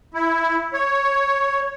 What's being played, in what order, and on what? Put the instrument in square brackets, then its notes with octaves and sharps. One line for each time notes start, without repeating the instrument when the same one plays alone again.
[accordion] E4
C#5